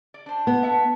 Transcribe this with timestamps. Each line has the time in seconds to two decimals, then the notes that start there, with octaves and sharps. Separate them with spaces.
0.14 D5
0.26 D4 C5
0.47 B3
0.63 E5 F#5 A5